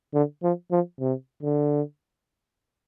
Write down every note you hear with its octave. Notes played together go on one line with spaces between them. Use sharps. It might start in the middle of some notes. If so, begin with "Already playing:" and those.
D3
F3
F3
C3
D3